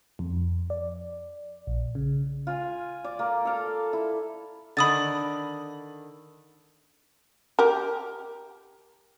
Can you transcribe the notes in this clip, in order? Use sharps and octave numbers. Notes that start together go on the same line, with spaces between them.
F2
D5
A#1
C#3
F4 G#5
D5
A#3
A4 F5 A#5
E4
D3 D#3 B5 D#6 A6
G4 A#4